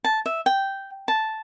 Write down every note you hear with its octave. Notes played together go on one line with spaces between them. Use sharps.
A5
E5
G5
A5